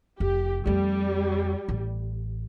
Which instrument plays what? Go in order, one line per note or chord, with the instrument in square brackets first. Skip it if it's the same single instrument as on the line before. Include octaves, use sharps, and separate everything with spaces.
[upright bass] F1 [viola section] G4
[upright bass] F2 A3 [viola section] G3
[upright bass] A1